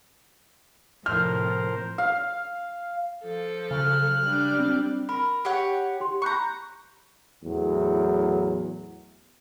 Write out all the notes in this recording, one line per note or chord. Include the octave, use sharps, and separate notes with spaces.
A2 C3 F3 A#4 C5 F6
F5
F3 A4
C#3 F#3 F6 F#6
G3 D4
C4
A#4 B5
G4 C#5 F#5
G4 C6
A#5 B5 C#6 F#6 G6
E2 A2 F#3